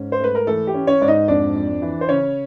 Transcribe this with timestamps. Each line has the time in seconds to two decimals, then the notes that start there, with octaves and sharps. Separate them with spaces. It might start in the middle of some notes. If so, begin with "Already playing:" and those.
Already playing: G#2 C#4
0.12 C5
0.20 A3 B4
0.35 A#4
0.47 E3 A3 A4
0.67 G4
0.74 C#4
0.87 C#4 C#5
1.01 G#2 D5
1.08 D#4 D#5
1.28 F2 D4 D5
1.55 F2
1.82 E3
2.01 C5
2.09 C#3 C#4 C#5